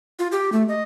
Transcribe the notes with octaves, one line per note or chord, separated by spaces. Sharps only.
F4
G4
A3
D#5